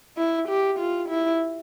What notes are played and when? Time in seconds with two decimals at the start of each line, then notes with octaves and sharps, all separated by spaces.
0.17 E4
0.49 G4
0.79 F4
1.09 E4